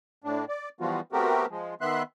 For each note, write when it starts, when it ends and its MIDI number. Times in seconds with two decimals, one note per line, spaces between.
0.24 0.45 45
0.24 0.45 62
0.49 0.69 74
0.81 1.01 52
0.81 1.01 53
0.81 1.01 55
0.81 1.01 59
0.81 1.01 65
0.81 1.01 66
1.12 1.46 57
1.12 1.46 59
1.12 1.46 60
1.12 1.46 66
1.12 1.46 67
1.12 1.46 70
1.50 1.74 53
1.50 1.74 56
1.81 2.03 51
1.81 2.03 59
1.81 2.03 76
1.81 2.03 84
1.81 2.03 90